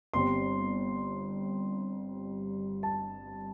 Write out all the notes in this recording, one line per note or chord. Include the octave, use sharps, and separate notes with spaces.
G1 G2 G3 C4 C6
A5